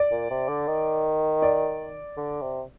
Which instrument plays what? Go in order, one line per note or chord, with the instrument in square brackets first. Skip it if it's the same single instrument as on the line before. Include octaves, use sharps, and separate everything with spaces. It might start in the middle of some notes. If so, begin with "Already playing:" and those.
Already playing: [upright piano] D5
[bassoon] A#2
C3
D3
D#3
[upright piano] D5
[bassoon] D3
C3